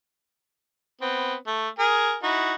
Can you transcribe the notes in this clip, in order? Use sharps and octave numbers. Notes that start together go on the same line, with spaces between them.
B3 C4
A3
G#4 A#4
D#4 E4 F#4